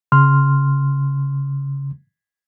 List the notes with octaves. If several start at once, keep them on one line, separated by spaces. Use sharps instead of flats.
C#3 C6 F6